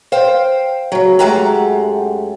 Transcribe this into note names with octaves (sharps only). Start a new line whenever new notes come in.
C5 F5 G5
C#3 F#3
F#2 G#3 A3 G4 F#5 A#5